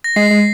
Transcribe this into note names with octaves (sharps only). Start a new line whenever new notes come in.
A#6
G#3 C7
G#3